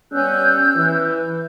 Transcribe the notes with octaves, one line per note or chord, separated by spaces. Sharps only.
G3 B3 C#4 E6 F#6 G6
E3